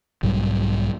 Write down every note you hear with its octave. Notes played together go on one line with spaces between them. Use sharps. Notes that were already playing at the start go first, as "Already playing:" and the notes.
B1 G#2 F#3 G3